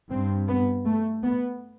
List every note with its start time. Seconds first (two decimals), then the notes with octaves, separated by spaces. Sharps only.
0.10 G2 C4
0.48 B3
0.86 A3
1.24 B3